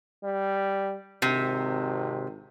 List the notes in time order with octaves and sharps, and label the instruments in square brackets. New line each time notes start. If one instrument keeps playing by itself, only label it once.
[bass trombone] G3
[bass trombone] G#1 [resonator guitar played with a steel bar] C3